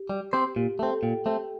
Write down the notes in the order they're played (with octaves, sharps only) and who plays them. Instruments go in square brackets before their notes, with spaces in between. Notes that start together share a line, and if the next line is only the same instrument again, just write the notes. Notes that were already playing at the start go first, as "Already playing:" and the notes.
Already playing: [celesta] G4
[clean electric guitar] G3
C4 G4 C5
[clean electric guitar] A#2 [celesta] G4
[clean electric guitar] A3 [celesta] A4
[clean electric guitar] C4
[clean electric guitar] A#2 [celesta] G5
[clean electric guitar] A3 C4